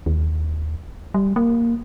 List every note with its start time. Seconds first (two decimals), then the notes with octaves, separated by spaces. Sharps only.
0.06 D#2
1.14 G3
1.36 A#3